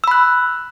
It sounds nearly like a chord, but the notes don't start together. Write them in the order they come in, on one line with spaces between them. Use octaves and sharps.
E6 B5 F#6